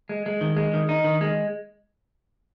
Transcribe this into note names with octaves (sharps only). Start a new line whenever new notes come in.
G#3
G#3
D#3
G#3
D#3
D#4
D#3
G#3